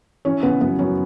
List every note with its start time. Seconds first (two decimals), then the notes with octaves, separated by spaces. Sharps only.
0.25 E3 C#4 C#5
0.43 C#3 B3 B4
0.61 F#2 B3 B4
0.79 F#2 C#4 C#5